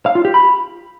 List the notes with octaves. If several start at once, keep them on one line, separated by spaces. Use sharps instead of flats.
F5
F4
G4
B5